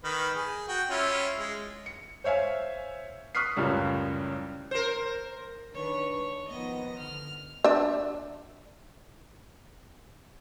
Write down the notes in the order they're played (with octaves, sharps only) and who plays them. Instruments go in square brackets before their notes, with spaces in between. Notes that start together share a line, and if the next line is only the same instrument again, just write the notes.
[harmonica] D#3 B4
G#4
F#4 G5
C#4 E4 F4
G#3
[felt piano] C#7
C5 C#5 E5 F5 G#5
C#6 D#6 F6 F#6 B6 C7
C#2 F#2 A2 C#3 G3 C#4
[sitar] A#4 C5
[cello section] D#3 D4 B4 [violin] C#5 C#6
[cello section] G#3 [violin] C#5
[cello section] D#3 F3 B3 [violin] D#5 A#6
[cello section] D3 [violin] F6
[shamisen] D4 E5